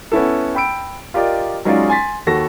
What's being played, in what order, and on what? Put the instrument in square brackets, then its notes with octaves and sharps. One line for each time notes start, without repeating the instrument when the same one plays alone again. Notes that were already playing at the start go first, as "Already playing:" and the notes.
[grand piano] B3 C#4 E4 A4
G5 B5 E6 D7
F4 G4 A#4 D5 D#5
F#3 G#3 C#4 D#4 F4 D5
G#5 C6 A6 B6
D#2 F#4 A4 A#6